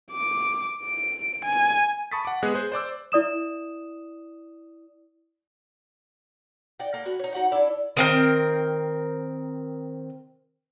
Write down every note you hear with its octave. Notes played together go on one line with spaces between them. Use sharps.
D6
D7
G#5
A5 B5 C#6 D#6 A6 B6
F#5 D6
G#3 B3 G#4 F#6
G#4 C5
C5 D5 D6 E6
E4 D5 D#6 E7
D5 D#5 F#5 G5
A#3 A4 G5
B3 F#4
D#4 C#5
D#4 F#4 F#5 G5
D4 E4 A4 D5
D#3 C4 A#4